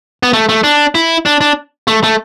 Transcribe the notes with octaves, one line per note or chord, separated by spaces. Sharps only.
B3
A3
A3
D4
E4
D4
D4
A3
A3